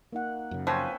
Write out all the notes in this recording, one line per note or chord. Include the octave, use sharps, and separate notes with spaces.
A#3 D#4 F#5
F#2 C#3
F3 C4 C#4 B4